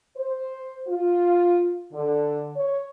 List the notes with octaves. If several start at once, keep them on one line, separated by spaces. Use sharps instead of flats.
C5
F4
D3
C#5